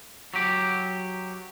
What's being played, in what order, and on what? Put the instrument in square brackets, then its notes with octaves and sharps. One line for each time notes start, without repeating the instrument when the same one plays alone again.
[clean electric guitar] F#3 G4